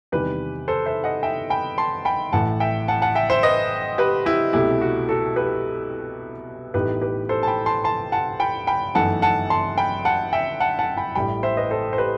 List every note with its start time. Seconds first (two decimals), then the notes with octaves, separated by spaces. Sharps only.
0.12 E2 C3 D#3 G3 G4 B4
0.68 A4 C5
0.86 C5 E5
1.04 D#5 F#5
1.23 E5 G5
1.50 G5 B5
1.78 A5 C6
2.05 G5 B5
2.33 A1 A2 E3 F#5 A5
2.60 E5 G5
2.88 F#5 A5
3.02 F#5 A5
3.15 E5 G5
3.30 C5 E5
3.43 B4 D#5
3.98 G4 B4
4.26 E4 G4
4.53 C2 B2 A3 E4 G4
4.81 F#4
5.09 F#4 A4
5.36 G4 B4
6.74 A1 A2 E3 B3 D#4 G4 B4
7.01 G4 B4
7.29 A4 C5
7.43 A5
7.48 G5 B5
7.66 A5 C6
7.84 A5 C6
8.12 F#5 A5
8.40 G5 B5
8.67 G5 B5
8.95 G1 F#2 E3 A3 D#4 F#5 A5
9.22 F#5 A5
9.50 A5 C6
9.78 G5 B5
10.05 F#5 A5
10.33 E5 G5
10.60 F#5 A5
10.79 F#5 A5
10.97 G5 B5
11.15 A1 A2 G3 G5 B5
11.43 C5 E5
11.57 B4 D#5
11.71 A4 C5
11.93 C5
11.98 G4 B4